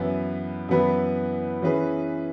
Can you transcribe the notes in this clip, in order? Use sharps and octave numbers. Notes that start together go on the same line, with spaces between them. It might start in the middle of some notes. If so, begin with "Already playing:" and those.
Already playing: F#2 E3 B3 E4 B4
F#2 E3 B3 E4 B4
E3 C#4 G#4 B4